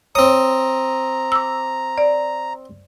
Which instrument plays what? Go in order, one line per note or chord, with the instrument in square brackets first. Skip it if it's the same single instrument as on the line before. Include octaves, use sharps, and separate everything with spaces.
[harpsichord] C4 D#6 [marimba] C#5 [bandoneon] A#5
[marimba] D6 E6
D5